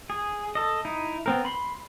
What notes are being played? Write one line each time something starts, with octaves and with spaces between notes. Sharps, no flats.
G#4
A4 D#5
D#4 E4
B3 C4 A#4
B5 C6